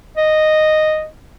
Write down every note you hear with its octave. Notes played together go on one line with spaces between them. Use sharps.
D#5